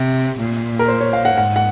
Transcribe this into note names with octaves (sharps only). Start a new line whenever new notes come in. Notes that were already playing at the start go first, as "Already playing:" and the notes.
Already playing: C3
A#2
A#4
C5
C#5
F5
F#5
G#2 F#5
F#5